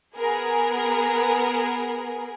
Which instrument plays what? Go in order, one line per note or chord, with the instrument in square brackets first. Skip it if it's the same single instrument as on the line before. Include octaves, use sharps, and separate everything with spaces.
[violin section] B3 G#4 A#4